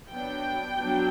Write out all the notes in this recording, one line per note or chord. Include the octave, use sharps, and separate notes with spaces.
F#3 B3 D4 G5
F#3 B3 D4